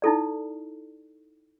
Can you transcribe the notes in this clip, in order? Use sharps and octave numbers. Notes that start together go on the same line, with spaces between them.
D#4 E4 A4 D5